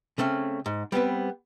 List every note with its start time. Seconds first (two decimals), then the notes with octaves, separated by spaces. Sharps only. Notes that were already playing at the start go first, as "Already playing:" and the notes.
0.18 C#3 A3 C4 C#4
0.66 G#2
0.92 G3 B3 C4 B4